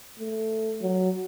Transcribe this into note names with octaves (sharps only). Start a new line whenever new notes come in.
A3
F#3